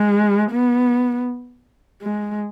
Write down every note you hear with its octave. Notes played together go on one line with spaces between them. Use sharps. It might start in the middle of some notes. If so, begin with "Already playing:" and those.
Already playing: G#3
B3
G#3